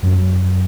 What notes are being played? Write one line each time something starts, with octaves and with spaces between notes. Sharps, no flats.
F#2 F#3